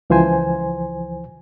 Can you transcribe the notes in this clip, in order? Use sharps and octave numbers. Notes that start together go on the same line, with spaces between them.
C#2 E3 F3 C5 G#5